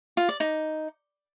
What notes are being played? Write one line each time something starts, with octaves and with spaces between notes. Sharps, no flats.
F4
D5
D#4